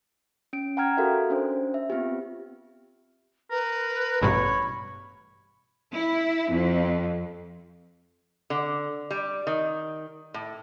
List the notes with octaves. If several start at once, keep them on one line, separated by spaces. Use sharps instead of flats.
C#4 D7
F#5 G5 A#5 F6 G#6
F#4 G4 A4 A#4 E5 F5
C#4 D4 C5
E5
B3 C4 F4 G4
A#4 B4
A1 G2 B2 C#5 B5
E4
F2
D3
G3
D#3
A2